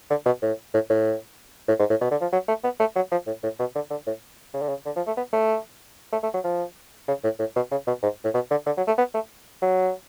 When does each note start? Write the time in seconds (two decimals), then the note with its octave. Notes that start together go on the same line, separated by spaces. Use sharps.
0.10 D3
0.26 B2
0.42 A2
0.74 A2
0.90 A2
1.68 A2
1.79 G#2
1.90 A2
2.01 B2
2.11 D3
2.21 F3
2.32 F#3
2.48 A3
2.64 B3
2.80 A3
2.95 F#3
3.11 F3
3.27 A2
3.43 A2
3.59 B2
3.75 D3
3.90 D3
4.06 A2
4.54 C#3
4.61 D3
4.69 C#3
4.86 D3
4.96 F3
5.07 A3
5.17 B3
5.33 A3
6.12 A3
6.23 A3
6.34 F#3
6.44 F3
7.08 C#3
7.24 A2
7.39 A2
7.56 B2
7.71 C#3
7.87 B2
8.03 G#2
8.24 A2
8.34 B2
8.51 D3
8.66 D3
8.77 F#3
8.87 A3
8.98 B3
9.14 A3
9.62 F#3